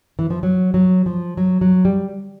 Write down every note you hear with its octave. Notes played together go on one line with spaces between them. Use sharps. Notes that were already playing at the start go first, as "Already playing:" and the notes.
E3
F3
F#3
F#3
F3
F#3
F#3
G3